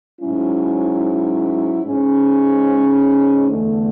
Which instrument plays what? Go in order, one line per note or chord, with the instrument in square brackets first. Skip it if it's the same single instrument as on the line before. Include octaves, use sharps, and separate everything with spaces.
[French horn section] G#2 F#3 C#4 E4
G#2 G#3 C#4
E2 D3 A3